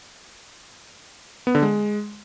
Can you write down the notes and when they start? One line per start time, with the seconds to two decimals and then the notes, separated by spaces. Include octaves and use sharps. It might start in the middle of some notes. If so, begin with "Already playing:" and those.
1.47 B3
1.55 D3
1.62 G#3